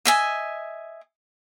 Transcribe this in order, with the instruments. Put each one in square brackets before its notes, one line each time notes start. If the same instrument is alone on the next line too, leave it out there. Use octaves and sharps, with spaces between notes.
[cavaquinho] D#5 E5 G#5